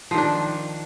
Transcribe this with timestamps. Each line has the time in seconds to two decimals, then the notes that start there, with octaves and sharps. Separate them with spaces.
0.11 F3
0.14 D#3
0.18 D4